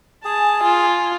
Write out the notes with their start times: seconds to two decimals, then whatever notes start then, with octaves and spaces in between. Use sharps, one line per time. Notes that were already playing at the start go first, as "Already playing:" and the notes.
0.25 G#4 G#5 A5
0.63 F4